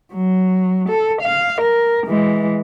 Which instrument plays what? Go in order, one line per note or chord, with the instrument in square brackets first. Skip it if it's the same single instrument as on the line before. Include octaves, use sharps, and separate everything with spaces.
[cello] F#3
A4
F5
A#4
E3 G#3